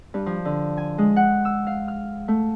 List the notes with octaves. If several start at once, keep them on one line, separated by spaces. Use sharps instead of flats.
G2
F3
D3
G#5
G#3
F#5
E6
F5
F6
A3